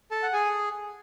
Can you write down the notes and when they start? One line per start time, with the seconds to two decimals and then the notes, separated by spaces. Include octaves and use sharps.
0.11 A4 A5
0.23 F#5
0.33 G#4 G#5